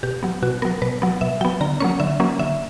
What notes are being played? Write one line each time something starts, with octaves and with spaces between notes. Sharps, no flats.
B2 G4
F#3 B3
B2 F#4
F#3 B3 A#4
B2 B4
F#3 B3
B2 E5
F#3 B3 G5
D3 A#5
F#3 A#3 C#4 C#6
D3 E5
F#3 A#3 C#4
D3 E5